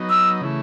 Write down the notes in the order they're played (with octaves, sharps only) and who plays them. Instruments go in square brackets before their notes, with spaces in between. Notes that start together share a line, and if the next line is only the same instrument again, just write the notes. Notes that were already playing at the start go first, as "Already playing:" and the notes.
Already playing: [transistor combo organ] F#3 B3 D#4
[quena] E6
[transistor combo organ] C#3 E3 A3